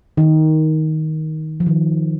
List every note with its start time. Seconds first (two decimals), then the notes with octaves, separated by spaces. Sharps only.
0.17 D#3
1.60 F3
1.66 D#3